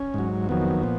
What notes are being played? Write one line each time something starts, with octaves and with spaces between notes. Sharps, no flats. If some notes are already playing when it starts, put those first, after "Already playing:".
Already playing: C#4
G#2 F#3
F2 D#3 F#3 B3
A#2 F3